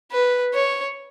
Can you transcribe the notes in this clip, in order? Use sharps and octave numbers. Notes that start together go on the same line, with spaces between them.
B4
C#5